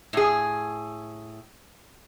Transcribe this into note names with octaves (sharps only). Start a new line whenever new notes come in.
A2 G#4